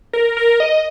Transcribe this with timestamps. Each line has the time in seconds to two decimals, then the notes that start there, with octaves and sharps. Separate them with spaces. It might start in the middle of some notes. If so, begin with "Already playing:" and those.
0.13 A#4
0.37 A#4
0.60 D#5